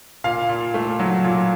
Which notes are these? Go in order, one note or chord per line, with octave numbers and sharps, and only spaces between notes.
A#2 F5
A#2
A3
F#3
A#2